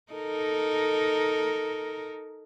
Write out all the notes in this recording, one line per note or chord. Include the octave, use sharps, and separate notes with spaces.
D#4 A4 A#4